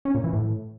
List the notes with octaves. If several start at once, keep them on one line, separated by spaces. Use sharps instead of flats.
C#4
A#2
E3
A2